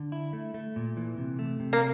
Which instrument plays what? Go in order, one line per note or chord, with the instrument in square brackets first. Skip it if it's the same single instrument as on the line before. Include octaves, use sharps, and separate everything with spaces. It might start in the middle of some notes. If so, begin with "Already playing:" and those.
Already playing: [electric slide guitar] D3
E4
A3
A3
A#2
E3
C3
A3
C3
[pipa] A#3